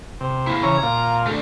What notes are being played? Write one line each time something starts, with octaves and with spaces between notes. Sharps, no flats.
C3
A#3 E4
C#3 E3 C#5 A#5
A#2 F4
A3 D4